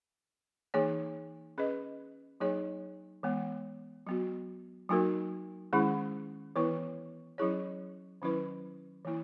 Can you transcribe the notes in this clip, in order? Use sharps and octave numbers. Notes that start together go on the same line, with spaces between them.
E3 A#3 D#4 G#4 C#5
C#4 G#4 B4 D#5
F#3 A#3 D#4 G#4 C#5
E3 G#3 B3
F#3 B3 F#4
F#3 A#3 D#4 F#4 A#4
D#3 G#3 C#4 E4 G#4
E3 B3 E4 B4
F#3 C#4 E4 G#4 C#5
D#3 F#3 C#4 E4 B4
E3 A#3 E4